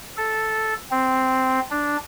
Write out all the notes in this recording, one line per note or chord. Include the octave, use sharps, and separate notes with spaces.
A4
C4
D4